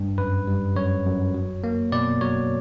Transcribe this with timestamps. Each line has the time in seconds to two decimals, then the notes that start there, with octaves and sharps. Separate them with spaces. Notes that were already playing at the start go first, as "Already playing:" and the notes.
Already playing: G2
0.18 F#2 B4
0.47 G3
0.76 F#2 C#5
1.05 F#2
1.34 F#3
1.64 A#3
1.92 B2 D5
2.21 F#3 C#5